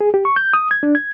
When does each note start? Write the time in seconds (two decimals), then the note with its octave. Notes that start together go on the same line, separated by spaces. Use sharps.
0.01 G#4
0.14 G4
0.25 C#6
0.36 G6
0.53 D#6
0.71 G#6
0.83 D4
0.95 G#6